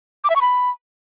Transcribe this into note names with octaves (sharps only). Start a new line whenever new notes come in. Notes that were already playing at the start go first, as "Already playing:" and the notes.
D6
E5
C#6
B5